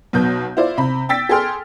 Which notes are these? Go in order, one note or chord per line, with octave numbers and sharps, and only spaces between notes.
B1 B2 G6
E4 F4 C5 D5
C3 B5
G5 E6 A6 B6
G#4 A4 G5 C6 F6